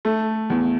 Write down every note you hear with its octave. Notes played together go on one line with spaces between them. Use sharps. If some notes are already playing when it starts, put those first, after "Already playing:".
A3
E2